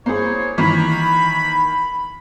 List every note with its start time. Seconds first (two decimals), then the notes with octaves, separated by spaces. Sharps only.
0.06 A#3 E4 G#4 C5 C#5
0.58 D#3 E3 A#3 B5